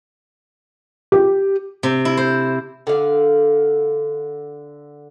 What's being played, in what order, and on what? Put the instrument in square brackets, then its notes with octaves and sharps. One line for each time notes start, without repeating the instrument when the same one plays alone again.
[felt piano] G4
[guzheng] C3
E4
C5
[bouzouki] D3 F5